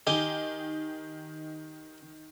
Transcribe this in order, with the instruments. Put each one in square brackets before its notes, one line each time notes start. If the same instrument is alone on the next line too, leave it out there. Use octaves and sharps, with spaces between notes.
[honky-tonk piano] D#3 [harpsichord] D#4 G4 G#5